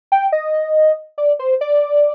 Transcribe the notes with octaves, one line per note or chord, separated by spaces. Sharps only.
G5
D#5
D5
C5
D5